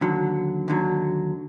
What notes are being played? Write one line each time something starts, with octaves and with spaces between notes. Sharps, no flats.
D#2 D3 F#3
D#2 D3 F#3